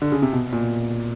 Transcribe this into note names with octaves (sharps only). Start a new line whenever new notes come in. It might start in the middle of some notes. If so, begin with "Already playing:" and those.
D3
C#3
C3
B2
A#2